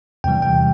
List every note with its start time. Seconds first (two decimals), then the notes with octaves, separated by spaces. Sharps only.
0.24 E2 C3 E3 G3 G5
0.42 G5